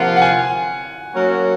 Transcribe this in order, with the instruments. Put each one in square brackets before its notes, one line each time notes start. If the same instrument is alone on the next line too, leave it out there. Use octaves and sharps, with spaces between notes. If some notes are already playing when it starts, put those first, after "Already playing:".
Already playing: [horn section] C3 F3 A#3 F4 [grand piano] F#5
[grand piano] F#5
G#5
[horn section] F#3 A#3 C#4 F#4 A#4